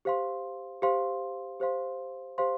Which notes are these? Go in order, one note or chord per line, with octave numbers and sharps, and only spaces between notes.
G4 C5 F5 C6
G4 C5 F5 C6
G4 C5 F5 C6
G4 C5 F5 C6